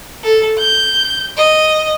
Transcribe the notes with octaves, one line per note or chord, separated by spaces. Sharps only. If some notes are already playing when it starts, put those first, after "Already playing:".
A4
G6
D#5